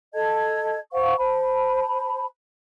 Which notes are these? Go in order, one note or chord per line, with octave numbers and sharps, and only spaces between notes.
A4 D#5 A5 G#6
C5 F5 F#5 C#6
C5 A5 B5